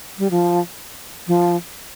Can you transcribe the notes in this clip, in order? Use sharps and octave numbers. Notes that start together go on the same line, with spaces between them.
G3
F3
F3